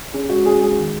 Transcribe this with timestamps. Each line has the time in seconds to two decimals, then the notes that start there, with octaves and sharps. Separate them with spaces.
0.13 C#4 G#4
0.29 G#3 F#4
0.45 C#4 G#4
0.61 G#3 G#4
0.78 D#3